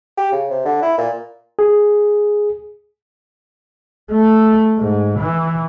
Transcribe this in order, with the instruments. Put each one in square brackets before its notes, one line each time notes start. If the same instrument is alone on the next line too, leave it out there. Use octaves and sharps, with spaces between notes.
[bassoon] G4
C#3
C3
D3
E4
A#2
[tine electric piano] G#4
[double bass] A3
G#2
E3